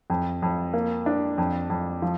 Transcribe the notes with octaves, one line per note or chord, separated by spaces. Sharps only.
F2
F2
A#3
D4
F2
F2
F3